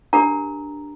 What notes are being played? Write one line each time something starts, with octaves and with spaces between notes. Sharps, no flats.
D4 G4 A#4 A#5